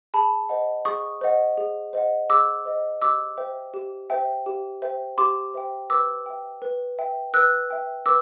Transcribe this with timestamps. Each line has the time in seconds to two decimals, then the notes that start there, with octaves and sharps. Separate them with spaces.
0.14 G#4 A5 B5
0.49 C5 D#5 F#5
0.85 G#4 C#6 D#6
1.21 C5 D#5 F#5
1.58 G#4
1.93 C5 D#5 F#5
2.30 G#4 D6 E6
2.65 C5 D#5 F#5
3.01 G4 D6 E6
3.37 C5 E5 G5
3.74 G4
4.10 C5 E5 G5
4.46 G4
4.82 C5 E5 G5
5.18 G4 C6 D6
5.54 C5 E5 G5
5.90 B4 D6 E6
6.26 E5 G5
6.62 B4
6.99 E5 G5
7.34 B4 E6 F#6
7.70 E5 G5
8.06 B4 D6 E6